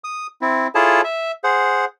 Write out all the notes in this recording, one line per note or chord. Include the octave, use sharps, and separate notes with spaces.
D#6
C4 E4
E4 F4 G#4 A4 C#5 A5
E5
G#4 C5 F#5